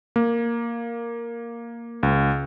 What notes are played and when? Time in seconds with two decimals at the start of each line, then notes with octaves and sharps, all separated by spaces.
0.16 A#3
2.03 C#2